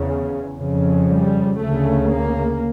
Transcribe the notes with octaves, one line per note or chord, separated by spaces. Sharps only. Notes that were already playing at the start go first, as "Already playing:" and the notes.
Already playing: E2 C#3
F2 C#3
G3
D2 C#3 A3
A#3